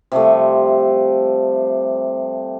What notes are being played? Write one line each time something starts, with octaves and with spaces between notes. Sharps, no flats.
C3 F3 G3 A3